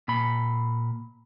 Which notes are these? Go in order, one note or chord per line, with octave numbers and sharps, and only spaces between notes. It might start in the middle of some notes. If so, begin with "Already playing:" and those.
A#2 B5